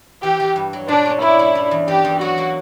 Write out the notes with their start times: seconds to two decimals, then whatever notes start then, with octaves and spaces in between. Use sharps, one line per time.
0.23 E3 G4
0.40 E3
0.56 G2
0.73 F#3
0.88 A#2 D4
1.06 C#4
1.22 D4 E4
1.39 G2
1.55 G3
1.71 E2
1.88 E3 G4
2.05 E2
2.21 F#3 F#4
2.38 A#3